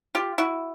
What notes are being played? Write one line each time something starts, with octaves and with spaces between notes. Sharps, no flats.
F4 G4
E4 F#4